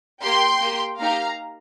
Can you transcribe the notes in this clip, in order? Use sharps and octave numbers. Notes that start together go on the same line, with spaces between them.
A#3 G4 G5 C6
A#3 G4
A#3 D#4 G4 F5 A#5